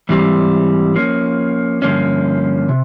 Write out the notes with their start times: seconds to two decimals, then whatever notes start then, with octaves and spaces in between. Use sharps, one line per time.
0.09 G#2 E3 G3 C4
0.96 F3 A#3 C#4
1.82 G2 D3 F3 A#3 C#4
2.69 C3